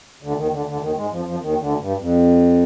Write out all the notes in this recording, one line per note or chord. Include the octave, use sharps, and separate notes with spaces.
D2 D3
D#2 D#3
D2 D3
D2 D3
D#2 D#3
G#2 G#3
F2 F3
F2 F3
D#2 D#3
D2 D3
G2
F2